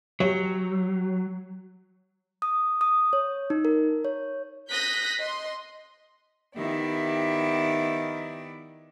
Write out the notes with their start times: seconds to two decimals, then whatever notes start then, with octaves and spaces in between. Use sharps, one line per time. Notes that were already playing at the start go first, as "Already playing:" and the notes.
0.20 F#3 G4 C#5
2.42 D#6
2.81 D#6
3.13 C#5
3.50 D#4
3.65 A#4
4.05 C#5
4.70 D#6 F#6 G6 A#6 B6
5.19 D#5 C6
6.56 D#3 B3 E4 G4 D5 E5